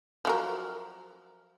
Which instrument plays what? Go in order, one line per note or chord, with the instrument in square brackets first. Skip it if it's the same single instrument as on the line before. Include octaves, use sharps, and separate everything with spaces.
[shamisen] F3 F#3 A#4